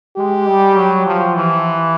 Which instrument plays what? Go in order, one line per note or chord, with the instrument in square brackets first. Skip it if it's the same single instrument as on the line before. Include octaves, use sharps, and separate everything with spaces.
[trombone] G#3 [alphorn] G4
[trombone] G3
F#3
F3
E3